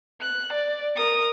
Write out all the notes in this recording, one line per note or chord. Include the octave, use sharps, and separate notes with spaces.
F#6
D5
A#4 D#6